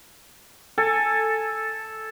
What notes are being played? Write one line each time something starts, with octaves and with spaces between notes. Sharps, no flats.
A4 G#5